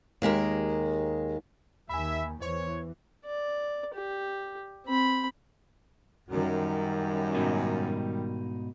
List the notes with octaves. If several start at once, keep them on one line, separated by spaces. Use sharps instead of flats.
D#2 G#3 G4 A#4
D#2 D#3 E5 G#5 B5
E2 E3 C5 C#5
D5
G4
C4 B5
F#2 D#3 G3
G#2 B2 D#4